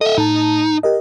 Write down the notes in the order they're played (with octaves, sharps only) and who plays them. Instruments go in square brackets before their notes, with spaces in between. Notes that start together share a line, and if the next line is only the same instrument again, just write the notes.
[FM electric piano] A4 [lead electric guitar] D#5 E5
[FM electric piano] A2 A5 [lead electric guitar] D#4
[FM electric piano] G4 A#4 D#5